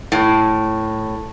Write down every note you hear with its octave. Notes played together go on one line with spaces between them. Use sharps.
A2